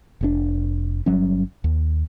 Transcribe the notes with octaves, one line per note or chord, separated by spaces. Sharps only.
F1 B2 D4
G1 F#3 G3 C#4
D#2